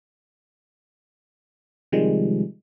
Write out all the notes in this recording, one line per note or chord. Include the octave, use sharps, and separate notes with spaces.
C3 D#3 F3 G3 G#3